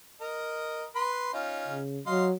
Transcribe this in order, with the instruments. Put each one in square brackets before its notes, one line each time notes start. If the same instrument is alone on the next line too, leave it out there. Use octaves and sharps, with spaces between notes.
[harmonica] A#4 D#5
B4 C6
C#4 D#4 F4
[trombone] C#3
[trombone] F#3 [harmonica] D#5 F5 C6